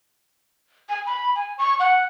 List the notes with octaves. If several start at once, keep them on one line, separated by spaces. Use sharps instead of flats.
G#5
B5
G#5
C#6
F#5